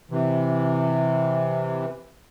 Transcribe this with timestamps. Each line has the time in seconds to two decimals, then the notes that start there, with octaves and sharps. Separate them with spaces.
0.11 C3 E3